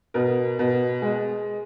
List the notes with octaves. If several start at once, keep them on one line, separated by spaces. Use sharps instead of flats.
B2 A#4
B2
G#3